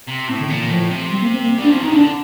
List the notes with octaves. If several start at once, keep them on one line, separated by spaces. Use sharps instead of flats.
C3
A2 C4
D3
A#2 D#3
D#3
A2 F3
C3
G3
A#3
C4
A#3
G3
D4
F3 C4
D#3 D#4
D3 D4